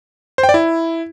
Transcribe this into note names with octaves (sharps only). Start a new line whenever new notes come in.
C5
G5
D5
E4